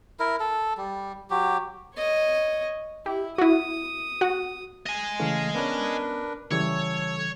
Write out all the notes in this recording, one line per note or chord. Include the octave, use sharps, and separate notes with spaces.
E4 A#4
A4
G3
F#3 G4
C#5 D#5
E4 G4
E4 F#4 D#6
F#4 F#5
D#5 G#5
C#3 E3 A3 F5
B3 C#4 D4 A#4 B4
C#3 E3 G3 A4 C#5